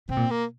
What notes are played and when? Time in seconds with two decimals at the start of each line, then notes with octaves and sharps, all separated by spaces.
0.09 C3 C4
0.17 A#2
0.31 A#3